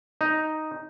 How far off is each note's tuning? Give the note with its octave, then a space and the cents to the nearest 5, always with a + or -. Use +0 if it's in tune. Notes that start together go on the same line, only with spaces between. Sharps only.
D#4 +0 D#5 +0